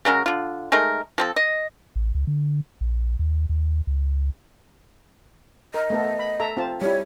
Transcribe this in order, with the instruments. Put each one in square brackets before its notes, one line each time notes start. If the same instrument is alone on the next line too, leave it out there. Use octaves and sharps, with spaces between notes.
[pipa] C#3 F#3 G#3 A#4
D3 F4
G#3 A3 D#4 A#4
F3 C4 A4
D#5
[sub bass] A1
C#2
D3
A#1
D#2
D#2
C#2
[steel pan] A#4 [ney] D#5
[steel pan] A3 B3 A4
B5
A4 E5 A#5
C4 F4 A5
[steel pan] G3 E4 [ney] C#5